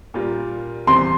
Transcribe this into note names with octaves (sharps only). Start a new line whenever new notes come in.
A#2 G3 A#3 F4
E2 C3 G3 C4 C6